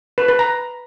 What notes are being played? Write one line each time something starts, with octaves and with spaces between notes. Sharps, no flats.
B4
B4
A#5